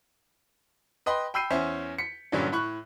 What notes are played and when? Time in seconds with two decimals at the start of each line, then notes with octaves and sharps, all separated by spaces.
1.06 B4 D#5 G5 B5 C6
1.34 G5 B5 E6 G6 C7 D#7
1.50 E2 C#4 C5 E5
1.98 B6 C#7
2.32 G2 A#2 D3 F#3 G3 C#4
2.52 A2 B5 C#6 F#6